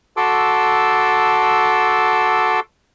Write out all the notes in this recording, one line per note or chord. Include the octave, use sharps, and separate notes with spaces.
F#4 A4 A5 C6 D6 E6